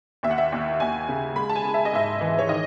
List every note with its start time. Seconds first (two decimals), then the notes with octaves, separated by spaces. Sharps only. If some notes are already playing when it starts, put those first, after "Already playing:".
0.23 D#2 E5
0.31 F#5
0.38 E5
0.52 D#2
0.80 D#2 G#5
1.09 C#3
1.36 G#3 B5
1.49 A5
1.56 G#5
1.64 G#3
1.74 E5
1.85 D#5
1.93 G#2 E5
2.21 E3
2.39 C#5
2.48 D#3 D#5